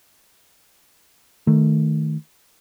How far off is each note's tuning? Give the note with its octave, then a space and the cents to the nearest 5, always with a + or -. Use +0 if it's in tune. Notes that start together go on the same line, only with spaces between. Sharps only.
D#3 +0 A3 +0